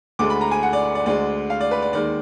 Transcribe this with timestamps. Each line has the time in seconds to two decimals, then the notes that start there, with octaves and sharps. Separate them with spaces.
0.19 D2 D3 G#3 D6
0.30 B5
0.41 A#5
0.51 G#5
0.63 F#5
0.73 D5
0.95 D5
1.06 D2 D3 G#3 D5
1.50 F5
1.61 D5
1.71 B4
1.82 D5
1.93 D#2 D#3 G#3 D5